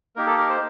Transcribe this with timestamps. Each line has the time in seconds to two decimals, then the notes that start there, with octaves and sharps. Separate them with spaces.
0.16 A#3 D#4 G4 A#4
0.26 A4
0.38 A#4
0.49 C5